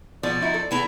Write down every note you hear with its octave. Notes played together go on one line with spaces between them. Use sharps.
B2 F3 D5
D#4 E4 F#4
A4
E2 E4 A#5